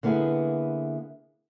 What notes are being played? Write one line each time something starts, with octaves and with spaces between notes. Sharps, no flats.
D3 A#3 B3 E4 G#4